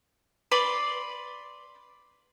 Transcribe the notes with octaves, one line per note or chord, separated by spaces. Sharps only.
B4 D5 B5 C6